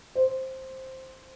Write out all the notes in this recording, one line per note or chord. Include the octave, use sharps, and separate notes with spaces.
C5